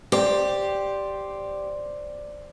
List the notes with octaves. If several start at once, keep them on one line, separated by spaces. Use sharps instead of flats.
G4 C5 D5